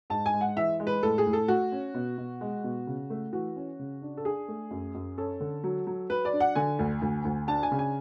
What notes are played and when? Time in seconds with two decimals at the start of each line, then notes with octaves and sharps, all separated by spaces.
0.10 G#2 A5
0.26 G#5
0.33 G#3
0.41 F#5
0.56 E3 E5
0.80 G#3
0.87 B4
1.03 A2 A4
1.18 G#4
1.26 A2
1.33 A4
1.48 A3 F#4
1.72 C#4
1.94 B2
2.18 B2
2.41 G#3
2.64 B2
2.87 C#3
3.10 A3
3.33 E3 F#4
3.56 C#4
3.79 C#3
4.02 D4
4.17 A4
4.25 D4 G#4
4.48 A3
4.71 F#2
4.95 F#2
5.18 C#4 A4
5.41 D3
5.64 F#3
5.87 F#3
6.10 F#3 B4
6.25 D5
6.33 D4
6.40 F#5
6.55 D3 G#5
6.79 D2
7.02 D2
7.25 D2
7.48 D4 A5
7.63 G#5
7.72 C#3
7.79 G#5